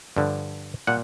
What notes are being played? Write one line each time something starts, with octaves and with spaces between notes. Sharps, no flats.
G2 D3 F3
A#2 G3 F#5